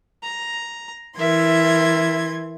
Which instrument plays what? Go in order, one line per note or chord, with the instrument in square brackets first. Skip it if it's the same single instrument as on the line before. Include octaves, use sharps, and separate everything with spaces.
[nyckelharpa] A#5
[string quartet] E3 C6 G#6 [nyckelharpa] A#4 E5